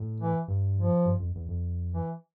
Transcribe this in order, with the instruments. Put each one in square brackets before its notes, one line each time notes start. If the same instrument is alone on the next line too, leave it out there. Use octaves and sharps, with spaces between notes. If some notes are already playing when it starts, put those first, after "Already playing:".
Already playing: [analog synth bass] A2
[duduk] E3
[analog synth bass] G2
[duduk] F3
[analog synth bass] G2
F2
E2
F2
[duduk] E3